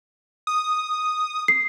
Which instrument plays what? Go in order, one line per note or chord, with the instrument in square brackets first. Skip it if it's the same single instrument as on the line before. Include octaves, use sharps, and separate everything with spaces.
[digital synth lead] D#6
[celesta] C7